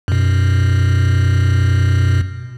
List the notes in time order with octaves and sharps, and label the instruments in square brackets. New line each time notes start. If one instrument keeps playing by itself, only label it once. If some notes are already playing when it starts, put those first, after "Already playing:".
[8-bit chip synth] F#2 B2